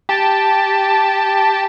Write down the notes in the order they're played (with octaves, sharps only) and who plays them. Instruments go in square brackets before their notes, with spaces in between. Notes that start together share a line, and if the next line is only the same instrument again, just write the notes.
[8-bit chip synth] G4 A5